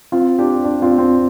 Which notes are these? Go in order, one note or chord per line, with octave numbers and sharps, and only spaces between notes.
C4 F4
D4 G4
D4
C4 F4
C4